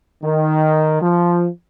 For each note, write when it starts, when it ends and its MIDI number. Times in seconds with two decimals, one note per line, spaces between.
0.23 1.00 51
1.01 1.48 53